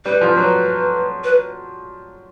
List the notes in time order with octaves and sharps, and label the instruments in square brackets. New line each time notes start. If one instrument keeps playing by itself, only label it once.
[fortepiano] G3 [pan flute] B4
[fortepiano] F3
[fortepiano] F#3 [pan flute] B4
[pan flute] B4